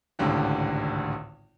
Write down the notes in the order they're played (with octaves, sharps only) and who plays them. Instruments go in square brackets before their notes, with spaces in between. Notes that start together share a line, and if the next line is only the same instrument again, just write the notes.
[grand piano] G#1 C#2 A2 D3 G4